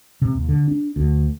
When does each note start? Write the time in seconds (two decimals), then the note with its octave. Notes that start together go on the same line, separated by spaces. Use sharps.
0.22 C3
0.35 D#2
0.49 D3
0.68 D4
0.96 D2